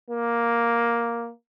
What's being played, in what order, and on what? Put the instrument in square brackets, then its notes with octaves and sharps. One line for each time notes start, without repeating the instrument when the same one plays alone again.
[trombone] A#3